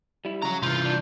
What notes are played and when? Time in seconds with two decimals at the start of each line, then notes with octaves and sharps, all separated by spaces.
0.25 G3 E4
0.42 C#3 F#4 A#5
0.63 C2 E3 F4 G6
0.85 D4